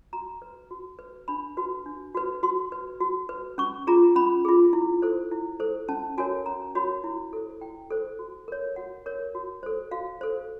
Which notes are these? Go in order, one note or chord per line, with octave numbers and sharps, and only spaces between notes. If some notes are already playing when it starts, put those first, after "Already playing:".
F#4 A#5
B4
F#4
B4
D4 B5
F#4 B4
D4
F#4 B4
F#4 C6
B4
F#4
B4
C#4 C#6
F4 G#4 A#5
C#4 B5
F4 G#4
E4
A4 C5
E4
A4 C5
C#4 A5
F#4 A#4 C#5 G#5
C#4 A#5
F#4 A#4 C#5 B5
E4
A4 C5
E4 G5
A4 C5
F#4
A#4 C#5
F#4 F#5
A#4 C#5
F#4
A4 C5
F#4 F5
A4 C5